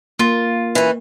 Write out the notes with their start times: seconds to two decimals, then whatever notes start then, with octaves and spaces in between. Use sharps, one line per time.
0.19 A#3 F4
0.75 E3 C#4